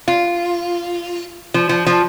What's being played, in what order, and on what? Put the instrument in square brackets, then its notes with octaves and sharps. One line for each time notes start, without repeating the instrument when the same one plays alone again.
[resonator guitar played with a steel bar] F4
F3
F3
F3